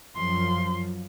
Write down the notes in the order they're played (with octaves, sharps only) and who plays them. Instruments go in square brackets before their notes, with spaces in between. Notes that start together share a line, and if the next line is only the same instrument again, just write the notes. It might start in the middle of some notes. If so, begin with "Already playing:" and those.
[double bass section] F#2 F3 [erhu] C6